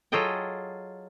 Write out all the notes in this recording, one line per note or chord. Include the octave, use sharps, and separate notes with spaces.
F#3 F4 G#4 A4 D#5 G5